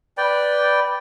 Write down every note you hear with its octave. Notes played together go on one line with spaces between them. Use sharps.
B4 D5 G5